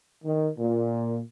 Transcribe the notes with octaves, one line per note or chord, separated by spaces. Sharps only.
D#3
A#2